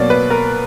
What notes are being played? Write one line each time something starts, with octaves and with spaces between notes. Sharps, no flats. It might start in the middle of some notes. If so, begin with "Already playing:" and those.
Already playing: B2 F#3 A#3 D5
B4
A#4